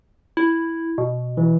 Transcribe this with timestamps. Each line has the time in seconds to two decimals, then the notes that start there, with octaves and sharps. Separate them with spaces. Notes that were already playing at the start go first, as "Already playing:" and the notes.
0.37 E4
0.98 B2
1.37 E3